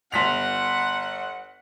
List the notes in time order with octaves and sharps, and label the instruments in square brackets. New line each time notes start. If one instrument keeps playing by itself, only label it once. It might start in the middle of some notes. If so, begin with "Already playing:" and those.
[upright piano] G1 B6 F7 [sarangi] F#5